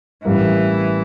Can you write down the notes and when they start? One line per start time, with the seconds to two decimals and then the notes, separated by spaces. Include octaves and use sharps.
0.25 A1 A2 E3 G3 A#3 E4